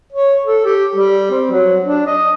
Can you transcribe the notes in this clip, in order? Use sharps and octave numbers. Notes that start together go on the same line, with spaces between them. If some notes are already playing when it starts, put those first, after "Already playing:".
C#5
A4
G4
G3
C4
F#3
D4
D#5